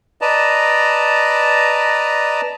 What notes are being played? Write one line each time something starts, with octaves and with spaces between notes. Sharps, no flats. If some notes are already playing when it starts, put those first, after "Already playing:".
B4 D5 D#5 A5 A#5